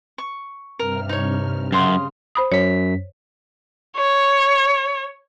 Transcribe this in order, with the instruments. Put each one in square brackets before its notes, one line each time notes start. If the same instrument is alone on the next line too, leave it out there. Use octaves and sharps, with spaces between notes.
[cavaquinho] C#6
[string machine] G2 C3 F6 [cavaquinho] A#4
[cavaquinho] D#4 C#5
[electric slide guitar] F#2 [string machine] C#3 [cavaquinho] F5 C6 D#6
[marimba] C5 B5 D#6
[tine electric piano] F#2 B6 [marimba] C#5
[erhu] C#5